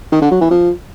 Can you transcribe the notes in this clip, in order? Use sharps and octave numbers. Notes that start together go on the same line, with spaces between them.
D#3
D3
F#3
E3
F3